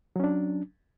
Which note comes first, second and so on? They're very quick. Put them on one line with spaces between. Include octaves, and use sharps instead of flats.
F#3 C#4 D4